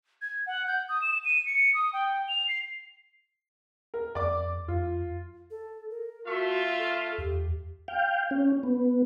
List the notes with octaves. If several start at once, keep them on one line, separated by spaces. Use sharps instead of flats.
G#6
F#5
G6
D#6
E7
D#7
C#7
D#6
G5
F7
C7
A#4
F2 D5 D6
F2 F4
A4
A#4
A3 F4 F#4 E5 C6
A4
E2 G4
F5 G5
C#4
B3